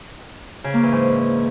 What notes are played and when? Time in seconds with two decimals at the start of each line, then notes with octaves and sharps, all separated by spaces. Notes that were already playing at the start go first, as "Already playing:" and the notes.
0.64 C#3
0.74 A#3
0.83 E3
0.92 G#2